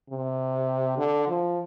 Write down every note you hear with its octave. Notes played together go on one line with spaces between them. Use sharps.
C3
D3
F3